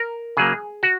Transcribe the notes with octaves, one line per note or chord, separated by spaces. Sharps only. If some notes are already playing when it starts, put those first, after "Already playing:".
Already playing: A#4
C#3 F#3 A#3 G#4
F#4